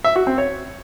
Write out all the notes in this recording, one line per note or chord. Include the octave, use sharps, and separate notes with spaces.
E5
F#4
C4
C#5